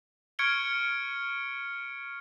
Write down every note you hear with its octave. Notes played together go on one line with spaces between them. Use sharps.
C#6 F6 G#6 C#7 D7 G7